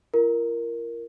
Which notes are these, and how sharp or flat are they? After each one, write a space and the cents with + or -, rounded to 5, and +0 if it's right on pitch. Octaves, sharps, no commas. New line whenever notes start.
F4 -45 A#4 +0